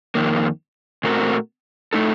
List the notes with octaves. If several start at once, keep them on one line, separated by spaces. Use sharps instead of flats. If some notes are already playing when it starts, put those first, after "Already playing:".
F2 D#3 A#3
A#2 A3 C4 F#4 A#4
A2 A3 D#4 A4